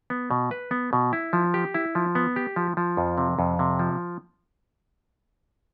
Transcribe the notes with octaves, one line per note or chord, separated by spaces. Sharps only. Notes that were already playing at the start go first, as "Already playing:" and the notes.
B3
B2
B4
B3
B2
E4
F3
G4
E4
F3
B3
G4
F3
F3
F2
C3
F2
C3
F3